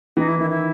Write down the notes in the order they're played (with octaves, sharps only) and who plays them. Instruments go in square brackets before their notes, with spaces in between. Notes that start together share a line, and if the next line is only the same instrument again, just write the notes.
[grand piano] E3 [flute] D#4
[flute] E4
[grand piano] D#3 [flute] E4
[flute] E4